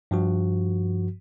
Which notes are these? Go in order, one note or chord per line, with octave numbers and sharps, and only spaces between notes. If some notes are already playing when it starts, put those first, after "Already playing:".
G2 F3 F#4